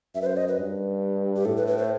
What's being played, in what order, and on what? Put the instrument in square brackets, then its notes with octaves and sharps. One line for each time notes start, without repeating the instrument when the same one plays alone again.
[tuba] F#2 [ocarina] E5
[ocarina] B4
C5
D#5
B4
[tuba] G2
[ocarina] G4
[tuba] A2 [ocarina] A4
[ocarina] B4
B4
C5